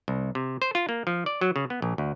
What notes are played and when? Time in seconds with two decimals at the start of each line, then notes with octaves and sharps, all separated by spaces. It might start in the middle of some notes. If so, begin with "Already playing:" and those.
0.08 C2
0.35 C3
0.62 C5
0.75 F4
0.89 A#3
1.07 F3
1.26 D5
1.41 F#3
1.56 C#3
1.70 B3
1.82 A#1
1.98 D2